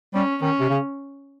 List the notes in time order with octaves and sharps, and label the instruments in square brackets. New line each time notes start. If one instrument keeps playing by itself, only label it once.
[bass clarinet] G3 [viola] C#4
[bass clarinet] D#3 [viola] C#4
[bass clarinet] C3
C#3